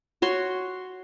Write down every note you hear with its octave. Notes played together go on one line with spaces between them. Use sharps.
F#4 C#5 C6